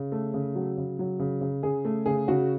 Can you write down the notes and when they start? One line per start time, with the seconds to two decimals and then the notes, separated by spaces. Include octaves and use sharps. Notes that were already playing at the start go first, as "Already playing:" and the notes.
Already playing: C#3
0.12 A3
0.34 C#3
0.55 F#3
0.77 C#3
0.99 F#3
1.19 C#3
1.41 C#3
1.63 C#3 G#4
1.85 A3
2.06 C#3 G#4
2.28 C#3 F#4